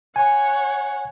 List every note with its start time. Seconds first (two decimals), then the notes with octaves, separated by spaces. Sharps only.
0.16 C#5 F#5 G#5